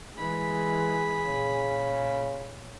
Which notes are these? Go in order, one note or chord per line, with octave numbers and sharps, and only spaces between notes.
E3 G#3 G#4 B5
A#2 C#3